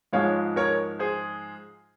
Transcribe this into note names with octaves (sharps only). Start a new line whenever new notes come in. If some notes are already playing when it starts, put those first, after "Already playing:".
G#2 F3 G#3 C#5 F5
A#4 C#5
G#4 C5